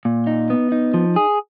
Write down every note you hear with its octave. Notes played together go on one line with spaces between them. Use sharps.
A#2
D#4
B3
D#4
F3
G#4